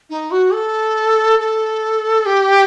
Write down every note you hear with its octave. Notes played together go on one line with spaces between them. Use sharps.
D#4
F#4
A4
A4
G4